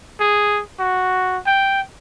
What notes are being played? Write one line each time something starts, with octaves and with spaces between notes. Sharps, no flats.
G#4
F#4
G5